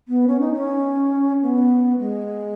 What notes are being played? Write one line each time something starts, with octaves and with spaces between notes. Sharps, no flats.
B3
C#4
D#4
C#4
B3
G#3